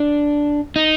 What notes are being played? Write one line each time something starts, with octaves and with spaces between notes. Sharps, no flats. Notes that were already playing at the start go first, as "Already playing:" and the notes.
Already playing: D4
D#4